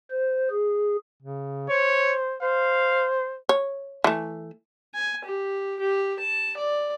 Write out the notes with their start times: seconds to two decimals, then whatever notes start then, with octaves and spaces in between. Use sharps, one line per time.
0.11 C5
0.50 G#4
1.22 C#3
1.70 C5 C#5
2.42 C5 F5
3.49 C#5
4.04 E3 A3
4.94 G#5
5.24 G4
5.79 G4
6.20 A5
6.57 D5